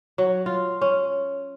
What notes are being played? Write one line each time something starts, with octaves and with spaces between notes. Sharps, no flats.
F#3
F4
C#4